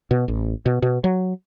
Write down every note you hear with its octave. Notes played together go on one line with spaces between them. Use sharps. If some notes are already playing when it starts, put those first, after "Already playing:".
B2
A1
B2
B2
F#3